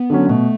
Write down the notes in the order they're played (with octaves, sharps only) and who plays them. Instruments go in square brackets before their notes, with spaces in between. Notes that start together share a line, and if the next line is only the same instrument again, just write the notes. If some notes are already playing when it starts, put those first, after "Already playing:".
Already playing: [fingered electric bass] B3
[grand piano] D3 F#3 C#4
[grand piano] B2 [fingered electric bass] A3